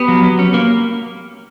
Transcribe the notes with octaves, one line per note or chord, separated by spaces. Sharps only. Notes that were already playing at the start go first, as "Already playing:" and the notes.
Already playing: B3 G4
F#3
F#3
C#4
A#3